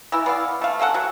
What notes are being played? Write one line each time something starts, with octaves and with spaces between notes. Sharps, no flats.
E3 E4
B3 D5 F5
A3 F5
A#3 C#4 A4 F#5
F#3